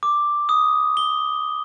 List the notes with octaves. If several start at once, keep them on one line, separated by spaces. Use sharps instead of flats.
D6
D#6
G7